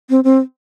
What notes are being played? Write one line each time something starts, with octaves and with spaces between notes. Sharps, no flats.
C4
C4